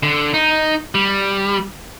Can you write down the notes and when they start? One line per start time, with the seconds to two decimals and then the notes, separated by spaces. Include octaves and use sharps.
0.03 D3
0.34 D#4
0.95 G3